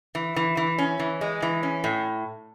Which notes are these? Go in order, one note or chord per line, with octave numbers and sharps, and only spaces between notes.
E3
E3
E3
C#4
E3
G#3
E3
C#4
A2